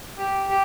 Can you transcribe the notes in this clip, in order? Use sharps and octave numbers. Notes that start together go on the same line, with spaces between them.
G4
G4